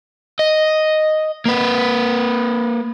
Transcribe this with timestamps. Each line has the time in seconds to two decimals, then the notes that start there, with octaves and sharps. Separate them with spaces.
0.39 D#5
1.46 A#3 B4